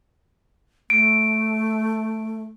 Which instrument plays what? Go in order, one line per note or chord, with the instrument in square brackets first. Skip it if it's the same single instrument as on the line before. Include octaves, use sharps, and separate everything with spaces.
[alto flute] A3 [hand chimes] D7